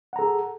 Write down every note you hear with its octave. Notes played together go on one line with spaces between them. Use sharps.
G#4 A4 F#5 A#5